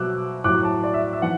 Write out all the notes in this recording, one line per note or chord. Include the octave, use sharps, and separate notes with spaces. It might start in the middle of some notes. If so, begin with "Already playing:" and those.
Already playing: B2 F#3 D6 E6 F#6
A2 F#3 D6 F#6
A5 D6
D5
E5
E5
E3 F#5